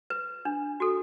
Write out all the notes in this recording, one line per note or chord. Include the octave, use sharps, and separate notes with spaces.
B4
D4
F#4 A4